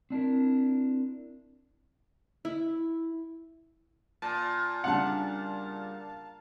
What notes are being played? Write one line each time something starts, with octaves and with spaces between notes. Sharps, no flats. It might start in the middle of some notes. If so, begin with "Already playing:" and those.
C4 D4 E4 A#4
E4
A#2 A5
C#3 G3 D4 F5 F#5 A5